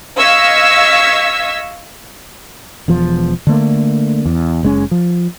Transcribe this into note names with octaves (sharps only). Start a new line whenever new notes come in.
D#5 F5 C#6 E6 G#6 B6
E1 E2 F3
D3 A3 A#3
E2
F#1 G#3 C#4
F3